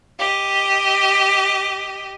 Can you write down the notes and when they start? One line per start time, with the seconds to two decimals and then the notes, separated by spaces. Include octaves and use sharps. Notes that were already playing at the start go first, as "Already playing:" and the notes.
0.19 G4 D#5